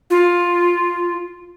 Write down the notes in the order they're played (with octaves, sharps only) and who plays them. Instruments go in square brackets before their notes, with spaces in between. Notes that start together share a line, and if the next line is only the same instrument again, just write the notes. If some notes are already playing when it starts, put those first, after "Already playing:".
[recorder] F4